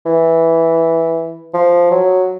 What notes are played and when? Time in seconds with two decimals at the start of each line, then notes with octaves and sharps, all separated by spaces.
0.06 E3
1.54 F3
1.91 F#3